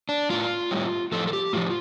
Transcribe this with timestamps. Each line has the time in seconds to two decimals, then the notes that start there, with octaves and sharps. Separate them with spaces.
0.09 D4
0.30 A2 G3 F4
0.71 A2 G3
1.12 A2 F3 A4
1.27 A4
1.33 G4
1.53 A2 F3 F4